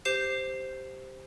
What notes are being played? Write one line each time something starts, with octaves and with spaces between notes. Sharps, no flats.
G4 C5 G6 C7 E7